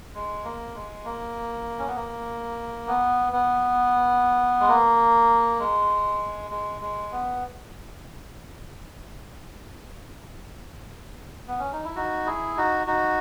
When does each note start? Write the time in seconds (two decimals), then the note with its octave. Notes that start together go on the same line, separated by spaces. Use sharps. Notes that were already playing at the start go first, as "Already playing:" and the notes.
0.15 G#3
0.44 A#3
0.74 G#3
1.05 A#3
1.79 C#4
1.87 B3
1.96 A#3
2.88 B3
3.33 B3
4.60 G#3
4.68 A#3
5.60 G#3
6.51 G#3
6.81 G#3
7.12 B3
11.48 B3
11.59 C#4
11.73 D#4
11.84 E4
11.96 D#4 F#4
12.26 E4 G#4
12.57 D#4 F#4
12.87 D#4 F#4